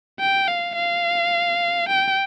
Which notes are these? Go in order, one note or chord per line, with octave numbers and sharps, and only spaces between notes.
G5
F5
F5
G5